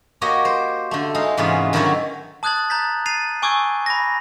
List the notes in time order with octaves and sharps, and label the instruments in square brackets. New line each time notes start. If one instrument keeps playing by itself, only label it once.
[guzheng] A#3 F#4 G4 C#5 D#5
C5
D3 A3
G#3 D#4 F5
G#2 C3 E3 B3 C#4 F4
D3 D#3 F#3 E4 A4 C#5
[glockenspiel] A5 D#6 F#6 G#6 A6 F#7
A#5 G6 A6 B6
A6 C7 D#7 F7
G#5 C#6 D6 E6 G6 G#6
B5 A#6